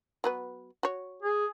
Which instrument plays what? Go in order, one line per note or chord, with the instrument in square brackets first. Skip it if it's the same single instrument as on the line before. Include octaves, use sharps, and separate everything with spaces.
[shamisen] F#3 B3 B4
F#4 C#5
[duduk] G#4